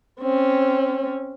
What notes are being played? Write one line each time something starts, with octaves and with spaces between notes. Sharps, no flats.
C4 C#4